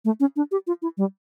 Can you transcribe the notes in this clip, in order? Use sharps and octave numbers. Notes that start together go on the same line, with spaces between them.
A3
C#4
D4
G4
F4
E4
G3